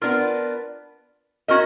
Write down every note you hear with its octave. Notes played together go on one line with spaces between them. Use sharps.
B3 D4 F4 A#4
C#4 F#4 A#4 D#5